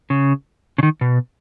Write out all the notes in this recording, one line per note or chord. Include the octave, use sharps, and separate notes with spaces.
C#3
C#3
D#3
B2